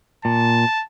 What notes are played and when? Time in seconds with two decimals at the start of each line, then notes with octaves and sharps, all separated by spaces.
0.25 A#2 A5